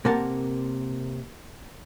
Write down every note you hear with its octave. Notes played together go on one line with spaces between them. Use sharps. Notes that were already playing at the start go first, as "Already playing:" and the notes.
C3 A#3 A#4 F#5 A5